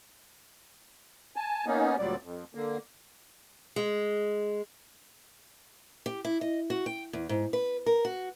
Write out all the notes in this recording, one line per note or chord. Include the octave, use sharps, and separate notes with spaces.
G#5 A5
A#3 B3 C#4 D#4
D2 A#2 F#3 G3 D5
F2
D3 A#3
G#3
G4
E4
D#5
F#4
G5
E2
G#2
B4
A#4
F#4